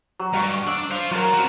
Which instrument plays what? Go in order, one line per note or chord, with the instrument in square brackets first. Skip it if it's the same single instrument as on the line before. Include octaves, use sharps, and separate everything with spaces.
[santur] F#3
[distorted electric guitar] G2 [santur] F5 C#6
[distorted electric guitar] D4 [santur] E6
[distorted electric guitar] C5 F5
[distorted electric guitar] F#3 [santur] F4 A#4
[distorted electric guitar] C4 F#4